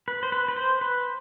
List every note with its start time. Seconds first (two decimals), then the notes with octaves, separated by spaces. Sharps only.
0.08 B4
0.23 C5
0.32 B4
0.48 B4
0.56 C5
0.81 B4